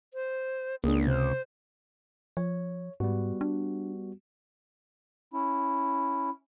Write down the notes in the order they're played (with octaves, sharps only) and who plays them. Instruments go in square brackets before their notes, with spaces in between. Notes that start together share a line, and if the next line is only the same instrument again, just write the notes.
[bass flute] C5
[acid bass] C#2 [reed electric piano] A#3 D4 [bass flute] G#4
[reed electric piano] C3 [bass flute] C5
[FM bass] F3 [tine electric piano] C#5
[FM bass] G#2 [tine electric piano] G3 B3 F#4
[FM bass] D4
[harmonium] C#4 E4